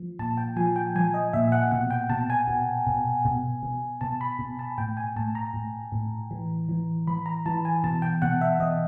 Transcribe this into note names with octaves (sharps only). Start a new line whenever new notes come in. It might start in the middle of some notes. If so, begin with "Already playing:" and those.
Already playing: F3
A#2 A5
G5
F3 G#5
G5
F3 G#5
D#5
A#2 E5
F#5
B2 F#5
G5
B2 A5
G#5
B2
B2
B2
B2
B2 A5
B5
B2
A5
A2 G5
G#5
A2 A5
A#5
A2
A2
E3
E3
E3 B5
A#5
E3 A5
G#5
B2 A5
G5
B2 F#5
E5
B2 D#5